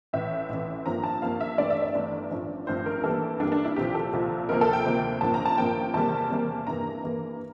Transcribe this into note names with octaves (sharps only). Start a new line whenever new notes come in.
A1 A2 E3 E5
A1 A2 E3
G2 F3 A#3 A#5
A5
G2 F3 A#3 F5
E5
G1 G2 E3 A3 D5
E5
D5
G1 G2 E3 A3
A1 G2 F3 A3
A1 G2 F3 A3 C5
A#4
G2 E3 G3 A#3 A4
G2 E3 G3 A#3 D4
D4
E4
C2 A#2 F3 G4
A4
C2 A#2 F3
D2 C3 F3 A#3 A#4
A4
G5
D2 C3 F3 A#3
A1 G2 F3 A#3 A5
A#5
A5
A1 G2 F3 A#3 G5
E2 C3 G3 A#3 A5
E2 C3 G3 A#3
G2 E3 A#3 A#5
G2 E3 A#3